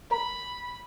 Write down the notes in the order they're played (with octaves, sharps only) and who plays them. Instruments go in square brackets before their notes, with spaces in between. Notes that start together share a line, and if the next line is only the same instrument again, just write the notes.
[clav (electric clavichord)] A#4 [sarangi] B5